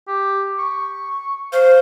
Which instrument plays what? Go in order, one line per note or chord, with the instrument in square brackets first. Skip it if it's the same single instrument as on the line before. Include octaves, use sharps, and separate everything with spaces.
[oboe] G4
C#6
[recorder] C5 [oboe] F5